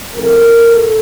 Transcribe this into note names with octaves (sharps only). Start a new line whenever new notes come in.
A2 F3 A3 C4 A#4
A2 A4